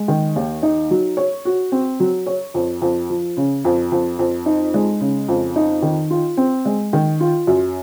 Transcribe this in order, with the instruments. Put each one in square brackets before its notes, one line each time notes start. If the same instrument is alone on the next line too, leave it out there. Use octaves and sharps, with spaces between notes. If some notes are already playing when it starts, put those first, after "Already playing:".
Already playing: [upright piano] G#3
D#3
D#2
D#4
F#3
C#5
F#4
C4
F#3
C#5
F2
F2
F3
C#3
F2
F2
F2
D#4
G#3
C#3
F2
D#4
D#3
F4
C4
G#3
D#3
F4
F#2